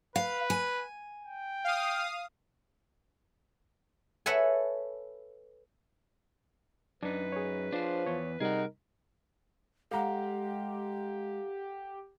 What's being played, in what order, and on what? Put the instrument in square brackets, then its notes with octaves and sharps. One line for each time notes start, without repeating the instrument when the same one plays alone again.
[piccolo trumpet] B4 [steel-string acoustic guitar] F5
[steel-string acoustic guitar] G#5
[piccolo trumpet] G5
[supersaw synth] F5 D#6
[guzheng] A4 B4 C#5 E5 F#5 G#5
[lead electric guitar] F#2 D#4 [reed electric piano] D4 [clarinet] B4
[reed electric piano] G#4 C#5
[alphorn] F3 [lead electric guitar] D4 C5
[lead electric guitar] E2 [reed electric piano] C#5
[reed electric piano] C3 G3 [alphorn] D#4 [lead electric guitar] G#4 F#5 [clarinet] A#4
[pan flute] G#3 [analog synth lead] G4 [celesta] A4 F#5 [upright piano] F5 A#5